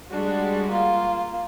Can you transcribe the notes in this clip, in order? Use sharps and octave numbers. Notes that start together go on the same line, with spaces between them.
G3 G#3 D4 F#4
A#3 F4